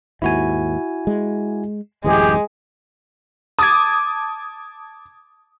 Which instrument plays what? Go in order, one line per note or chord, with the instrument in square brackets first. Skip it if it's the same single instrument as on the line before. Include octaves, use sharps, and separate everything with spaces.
[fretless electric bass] D#2 G#2 [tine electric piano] E4 F#4 G#5
[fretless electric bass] G#3
[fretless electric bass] D1 F#2 E3 [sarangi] G#3 [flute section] G4 G#4
[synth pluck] A5 D6 G#6 [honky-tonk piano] D#6